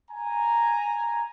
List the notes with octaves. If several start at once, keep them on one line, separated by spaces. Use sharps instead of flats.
G#5 A#5